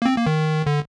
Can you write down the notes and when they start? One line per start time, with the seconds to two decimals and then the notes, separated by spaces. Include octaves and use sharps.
0.02 A#3
0.06 C4
0.17 A#3
0.26 D#3
0.66 D3